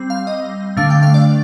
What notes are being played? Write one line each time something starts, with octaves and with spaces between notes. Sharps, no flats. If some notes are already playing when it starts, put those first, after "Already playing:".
Already playing: G3 C4
F5
D#5
D3 A3 D4 F5
G5
F5
D5